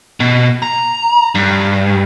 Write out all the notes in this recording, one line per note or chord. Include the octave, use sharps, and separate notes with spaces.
B2
A#5
G2